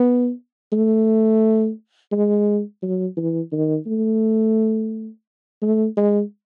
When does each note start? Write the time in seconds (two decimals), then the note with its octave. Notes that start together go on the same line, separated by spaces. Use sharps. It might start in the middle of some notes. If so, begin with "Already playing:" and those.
Already playing: B3
0.73 A3
2.12 G#3
2.83 F#3
3.17 E3
3.52 D#3
3.87 A3
5.62 A3
5.97 G#3